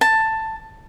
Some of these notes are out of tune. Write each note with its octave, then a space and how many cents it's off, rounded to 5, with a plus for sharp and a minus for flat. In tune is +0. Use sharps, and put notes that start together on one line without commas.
A5 +10